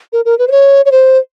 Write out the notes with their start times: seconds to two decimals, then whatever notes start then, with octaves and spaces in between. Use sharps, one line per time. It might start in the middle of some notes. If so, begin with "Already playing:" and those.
0.13 A#4
0.25 A#4
0.39 B4
0.48 C5
0.51 C#5
0.86 C#5
0.92 C5